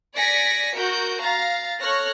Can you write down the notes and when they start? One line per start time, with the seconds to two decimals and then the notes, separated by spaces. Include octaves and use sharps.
0.15 D5 G#5 A#6 B6 C#7
0.76 F#4 A#4 G6
1.21 F5 A#5 A6
1.81 A4 C#5 C#6 F6 F#6 A#6